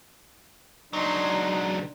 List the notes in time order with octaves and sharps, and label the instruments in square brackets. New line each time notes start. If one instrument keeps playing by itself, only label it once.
[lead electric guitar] C#2 F#3 [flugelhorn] D4 [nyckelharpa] D#4 C6